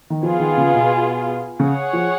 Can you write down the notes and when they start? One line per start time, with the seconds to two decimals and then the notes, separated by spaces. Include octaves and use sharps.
0.10 D#3
0.22 F3 B3 F4 G#4
0.40 D#3
0.57 C#3
0.74 B2
1.59 C#3 G#4 C#5 F#5
1.93 F3